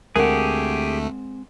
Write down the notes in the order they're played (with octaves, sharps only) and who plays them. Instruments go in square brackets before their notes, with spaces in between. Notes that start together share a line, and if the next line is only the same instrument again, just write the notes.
[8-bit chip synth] D2 A3 [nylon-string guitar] G#3 C4 F#5 [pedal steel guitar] G4 G#4 [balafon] A#4